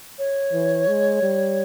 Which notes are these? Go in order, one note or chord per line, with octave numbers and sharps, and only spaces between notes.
C#5
E3
G#3
G3